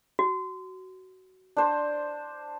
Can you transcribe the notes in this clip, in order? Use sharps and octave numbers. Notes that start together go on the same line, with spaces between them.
F#4
D4 C5